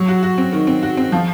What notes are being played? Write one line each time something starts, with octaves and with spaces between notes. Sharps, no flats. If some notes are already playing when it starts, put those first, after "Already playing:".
Already playing: F#3
F#4
F#4
C4
D#3
C4
F#4
C4
F3